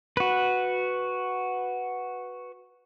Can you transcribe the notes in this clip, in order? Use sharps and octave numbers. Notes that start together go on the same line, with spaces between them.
F#4 B4